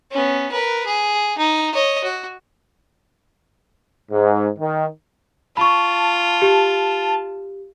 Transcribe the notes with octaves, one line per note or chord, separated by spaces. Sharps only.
B3 C#4
A#4 B4
G#4
D#4
C#5 D#5
F#4
G#2
D#3
F4 A5 B5 C#6
G4